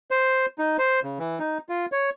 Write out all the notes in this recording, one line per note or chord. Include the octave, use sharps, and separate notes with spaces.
C5
D#4
C5
C#3
E3
D#4
F4
C#5